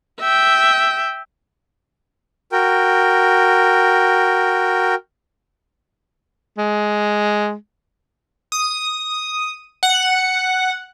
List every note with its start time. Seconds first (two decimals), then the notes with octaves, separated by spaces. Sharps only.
0.20 E5 G5
2.52 F#4 A#4 G5
6.58 G#3
8.52 D#6
9.83 F#5